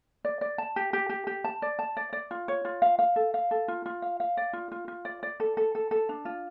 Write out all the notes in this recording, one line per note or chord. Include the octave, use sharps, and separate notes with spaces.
D5
D5
A5
G4
G4
G4
G4
A5
D5
A5
D5
D5
F4
C#5
F4
F5
F5
A4
F5
A4
F4
F4
F5
F5
D5
F4
F4
F4
D5
D5
A4
A4
A4
A4
D4
F4